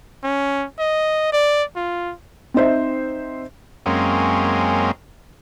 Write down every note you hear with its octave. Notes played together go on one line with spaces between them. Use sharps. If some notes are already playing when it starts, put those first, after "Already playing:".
C#4
D#5
D5
F4
C4 D#4 C5 E5
F#2 G#3 A#3 C4 C#4